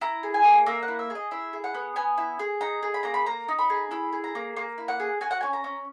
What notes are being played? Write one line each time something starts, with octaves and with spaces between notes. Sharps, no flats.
E4 A#5
G#4
G#5
A#3
A#3 E5
F#5
E4
E5
G#4
D#5
E4 E5
G#4
F#5
B3
B3 G#5
E4
G#4
D#4 A#5
G#4
B5
A#3 A#5
B5
A#3 A#5
D#4
B5
G#4
E4 B5
G#4
A#5
A#3
A#3
E4
F#5
G#4
F#4 G#5
F#5
C#4 G#5
A#5
C#4